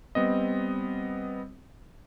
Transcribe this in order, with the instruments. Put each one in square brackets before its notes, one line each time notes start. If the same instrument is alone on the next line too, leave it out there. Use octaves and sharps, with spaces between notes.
[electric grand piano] G3 B3 C4 D#5